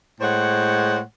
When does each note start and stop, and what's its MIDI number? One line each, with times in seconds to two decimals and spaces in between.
0.21 1.00 45
0.21 1.00 56
0.21 1.00 72
0.21 1.00 73
0.21 1.00 78